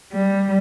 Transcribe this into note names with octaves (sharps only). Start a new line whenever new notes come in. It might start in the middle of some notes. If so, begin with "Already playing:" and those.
G3